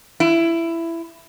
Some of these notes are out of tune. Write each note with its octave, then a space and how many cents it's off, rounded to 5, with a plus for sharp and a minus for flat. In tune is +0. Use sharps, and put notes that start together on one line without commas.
E4 +15